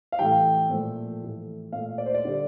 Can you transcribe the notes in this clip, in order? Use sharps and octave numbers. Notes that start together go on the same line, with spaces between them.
F5
A2 E3 G3 G5
A#2 F3 A3
A2 E3 G3
A#2 A3 F5
D5
C5
D5
D3 G3